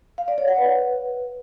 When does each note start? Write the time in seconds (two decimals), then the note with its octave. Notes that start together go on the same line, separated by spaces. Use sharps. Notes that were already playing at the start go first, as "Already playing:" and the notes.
0.18 F5
0.28 D5
0.38 C#5
0.48 F#5
0.58 B4